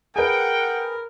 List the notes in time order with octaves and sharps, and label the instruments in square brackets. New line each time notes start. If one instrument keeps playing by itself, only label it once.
[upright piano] G#4 B4 [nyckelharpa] A#4 [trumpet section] F#5 G5